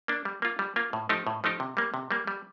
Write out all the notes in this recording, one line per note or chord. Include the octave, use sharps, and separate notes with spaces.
A#3 D4
G3
A#3 F4
G3
A#3 F4
A2
F3 A3 D#4 G4
A2
F3 A3 D#4 G4
C3
G3 A#3
C3
G3 A#3
G3